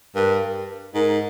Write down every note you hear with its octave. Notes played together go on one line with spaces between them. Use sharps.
G2 A#4
G#2 A#4